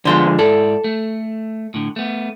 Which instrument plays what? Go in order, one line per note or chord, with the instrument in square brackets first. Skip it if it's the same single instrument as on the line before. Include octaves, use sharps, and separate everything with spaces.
[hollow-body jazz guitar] D3 F3 G#3 [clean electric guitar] B3 C6
[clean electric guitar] G#2 E4 D5 [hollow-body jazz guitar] A4
[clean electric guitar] A3
A2 D3
A3 B3